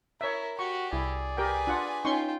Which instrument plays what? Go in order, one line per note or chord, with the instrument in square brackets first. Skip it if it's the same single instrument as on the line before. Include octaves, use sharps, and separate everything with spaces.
[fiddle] E4 [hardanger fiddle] A#4 [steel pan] C#5 E5
[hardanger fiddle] F#4 F#5 [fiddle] G4 [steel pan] C#6
[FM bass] C2 [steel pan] E4 [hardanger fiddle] G#4 D5
[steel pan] G4 A#4 G5 [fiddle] B4 G#5
[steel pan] D4 F4 F#5
[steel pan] C#4 C6 C#6 [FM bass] D#4 [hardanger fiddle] F4 G5